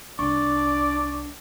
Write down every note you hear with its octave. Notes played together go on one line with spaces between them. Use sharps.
C2 D4 D5 C#6